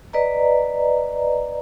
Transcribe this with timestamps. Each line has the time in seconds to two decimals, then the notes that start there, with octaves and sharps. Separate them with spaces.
0.13 B4 D5 D#5 A#5